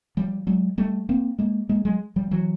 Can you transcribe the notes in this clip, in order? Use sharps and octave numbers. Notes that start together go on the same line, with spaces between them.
F3 G3
F#3 G#3
G3 A3
A#3 C4
G#3 A#3
G#3 A#3
F#3 G#3
F3 G3
E3 F#3